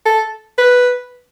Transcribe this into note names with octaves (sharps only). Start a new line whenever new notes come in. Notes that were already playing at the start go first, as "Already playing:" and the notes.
A4
B4